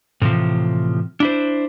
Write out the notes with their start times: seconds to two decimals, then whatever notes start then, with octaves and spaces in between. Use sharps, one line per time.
0.22 A2 C3 E3 F3
1.20 D4 E4 C5